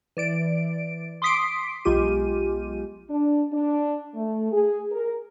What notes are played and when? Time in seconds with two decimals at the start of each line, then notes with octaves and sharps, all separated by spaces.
0.17 E3 D5 D7
1.22 C6 D6 D#6 B6 C7 D7
1.85 B1 G#3 F4 G4 D#7
3.09 D4
3.52 D4
4.15 A3
4.52 G#4
4.92 A#4